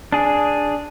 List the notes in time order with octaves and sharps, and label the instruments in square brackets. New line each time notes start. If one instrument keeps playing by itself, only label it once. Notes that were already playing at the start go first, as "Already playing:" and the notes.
[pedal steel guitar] D4 G#4